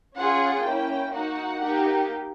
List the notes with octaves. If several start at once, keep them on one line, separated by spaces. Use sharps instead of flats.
C#4 F4 G#4 F#5
A#3 C#4 E4 G5
A#3 D#4 F#4 F#5
A#3 D#4 G4